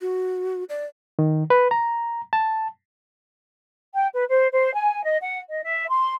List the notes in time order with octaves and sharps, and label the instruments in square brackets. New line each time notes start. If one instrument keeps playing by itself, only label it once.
[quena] F#4
D5
[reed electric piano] D#3
B4
A#5
A5
[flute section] G5
B4
C5
C5
G#5
D#5
F#5
D#5
E5
C6